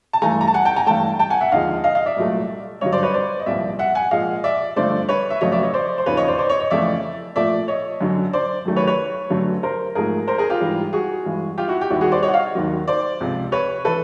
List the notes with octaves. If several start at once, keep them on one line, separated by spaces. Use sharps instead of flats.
A5
G2 E3 A3 G#5 A#5
A#5
A5
F#5 G#5
G5 A5
G#5 A#5
G2 E3 A3 G5 A5
G5 A5
F#5 G#5
E5 F#5
D#2 D3 F3 G#3 D#5 F5
D#5 F5
D#5 F5
D5 E5
C2 A#2 F#3 A3
G2 D3 F#3 C#5 D#5
C5 D5
B4 C#5
C5 D5
D#5
C2 A#2 F3 D5 E5
E5 F#5
F#5 G#5
A#2 F3 G#3 D#5 F5
D5 E5
G2 D3 F3 A3 C5 D5
B4 C#5
E5
F2 C#3 F#3 A3 C#5 D#5
D5 E5
C#5 D#5
C5 D5
C5
D#2 C#3 F3 B4 C#5
C#5 D#5
C5 D5
C5 D5
C#5 D#5
C#5 D#5
F2 C#3 E3 A3 D5 E5
A#2 F3 A3 D5 E5
C#5 D#5
F#2 D3 F#3
C5 D5
F#2 D#3 F#3 A3
B4 C#5
B4 C#5
F#2 D3 F#3 A3
A#4 C5
G#2 F3 A3 G#4 A#4
A#4 C5
G#4 A#4
F4 G4
G#2 E3 G3
F#4 G#4
G2 E3 G#3
F4 G4
E4 F#4
G4
D#2 D#3 G3 E4 F#4
F#4 G#4
C5 D5
C#5 D#5
F#5
D#5 F5
D#2 D#3 F#3
C5 D5
C#2 C3 F3
B4 C#5
E3 A4 B4